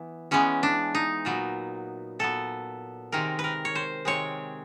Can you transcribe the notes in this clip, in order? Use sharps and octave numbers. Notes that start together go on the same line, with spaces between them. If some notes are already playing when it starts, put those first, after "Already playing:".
Already playing: E3 B3
E3 G#3 B3 C#4
D4
D#4
A#2 F#3 B3
A#2 F#3 B3 A4
C3 D#3 G#3 C4 A#4
B4
A#4
C#5
C5
C3 D#3 G#3 C4 C#5